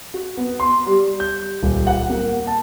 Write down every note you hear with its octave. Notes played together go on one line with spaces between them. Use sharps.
F#4
B3
C6
G3
G6
D#1
F#5
A#3
A5